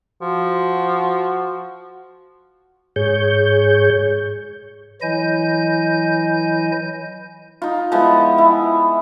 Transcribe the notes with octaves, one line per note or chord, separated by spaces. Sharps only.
F3 F#4
G#2 G#4 C#5 G6
E3 F#3 E4 D#5 G#5 G6
D#4 F4
F3 G#3 B3 E4
E4